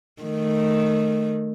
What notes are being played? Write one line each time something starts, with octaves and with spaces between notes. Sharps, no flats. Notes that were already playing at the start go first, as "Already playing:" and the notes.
D#3 A3